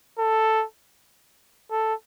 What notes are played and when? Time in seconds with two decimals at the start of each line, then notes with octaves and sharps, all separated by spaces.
0.19 A4
1.71 A4